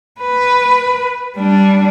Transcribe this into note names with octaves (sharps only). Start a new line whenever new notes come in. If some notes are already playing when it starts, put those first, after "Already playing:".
B4
G3 D4